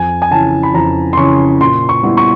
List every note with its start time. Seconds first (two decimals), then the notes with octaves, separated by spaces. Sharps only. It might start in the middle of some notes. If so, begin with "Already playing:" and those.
Already playing: F2 G#5
0.22 G#5
0.31 C#3 E3 A5
0.63 B5
0.74 F2 A#5
1.13 C6
1.17 C#3 E3 C#6
1.61 A#2 C6
1.89 C#6
2.03 G3 B3 E4
2.17 C#6